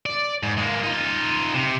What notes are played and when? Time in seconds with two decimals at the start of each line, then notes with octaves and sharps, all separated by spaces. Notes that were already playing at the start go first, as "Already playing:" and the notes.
0.06 D5
0.43 G#2
0.58 G#3 A#3
0.83 D#4 F4
1.54 C3